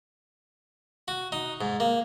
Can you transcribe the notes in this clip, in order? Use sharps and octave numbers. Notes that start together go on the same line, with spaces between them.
F#4
D#4
G#2
A#3